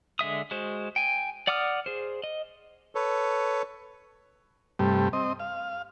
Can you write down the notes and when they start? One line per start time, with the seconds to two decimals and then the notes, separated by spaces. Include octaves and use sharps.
0.19 D3 G#3 E5 D#6
0.51 G#3 F#4 C5
0.96 G5 G#5
1.47 D5 F#5 D6 D#6 F6
1.86 G#4 C5
2.24 D#5
2.95 A4 B4 C#5
4.79 G2 C3 G3 A3
5.13 C4 D#5
5.40 F5